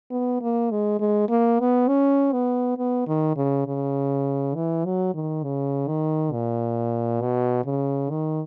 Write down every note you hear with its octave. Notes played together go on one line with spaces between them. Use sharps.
B3
A#3
G#3
G#3
A#3
B3
C#4
B3
B3
D#3
C#3
C#3
E3
F#3
D#3
C#3
D#3
A#2
B2
C#3
D#3